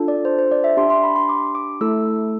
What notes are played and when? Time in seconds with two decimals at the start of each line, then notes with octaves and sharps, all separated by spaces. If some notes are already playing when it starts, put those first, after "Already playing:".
Already playing: D4 F4 A4
0.08 D5
0.25 C5
0.39 C5
0.52 D5
0.64 E5
0.77 D4 G4 C6
0.90 C6
1.04 B5
1.16 C6
1.29 D6
1.55 D6
1.81 A3 E4 A4 E6